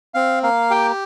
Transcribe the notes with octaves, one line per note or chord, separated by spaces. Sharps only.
C4 F5
A#3 F5
G4 G5